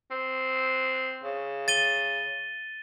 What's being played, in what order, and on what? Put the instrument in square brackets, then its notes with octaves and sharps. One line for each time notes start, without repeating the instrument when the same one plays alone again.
[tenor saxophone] C4
C#3
[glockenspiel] A6 D#7 G7